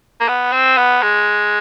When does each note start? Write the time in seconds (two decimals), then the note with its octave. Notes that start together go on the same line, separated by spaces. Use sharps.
0.21 A#3
0.28 B3
0.53 C4
0.78 B3
1.02 G#3